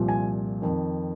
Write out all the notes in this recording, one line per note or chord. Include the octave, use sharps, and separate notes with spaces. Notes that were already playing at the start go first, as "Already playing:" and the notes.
Already playing: C2 A#2 F3
G#5
F2 D#3